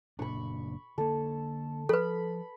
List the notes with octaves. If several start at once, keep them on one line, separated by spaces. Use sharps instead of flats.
F#1 A#2 D4 B5 C#6
D3 A#3 A4
F3 A4 B4 B5